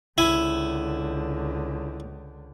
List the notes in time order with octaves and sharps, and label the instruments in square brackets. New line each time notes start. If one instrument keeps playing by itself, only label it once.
[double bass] C#2 D3 [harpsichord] E4 G#5